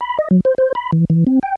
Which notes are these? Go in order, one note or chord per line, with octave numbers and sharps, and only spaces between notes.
B5
D#5
F#3
C5
C5
B5
E3
E3
C4
G5